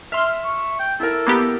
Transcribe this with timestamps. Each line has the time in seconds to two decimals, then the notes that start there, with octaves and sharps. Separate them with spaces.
0.12 E5 C6 F6
0.44 C#6
0.79 G5
1.00 E4 A4 A#4
1.27 A#3 B3 G4